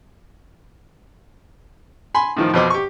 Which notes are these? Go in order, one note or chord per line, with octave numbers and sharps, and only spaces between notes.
G#5 B5 C6
A2 D#3 F3
F2 B2 C5 D6
G4 C#6